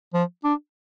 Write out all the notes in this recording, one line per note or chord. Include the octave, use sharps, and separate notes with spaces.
F3
D4